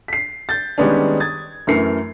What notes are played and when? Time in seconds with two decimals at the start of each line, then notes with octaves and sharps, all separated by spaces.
0.08 B6 C7
0.49 G6 A6
0.78 D#3 G3 G#3 B3 C#4 D4
1.20 D#6 G#6 A6
1.67 F#2 E3 A3 A#4 C7 C#7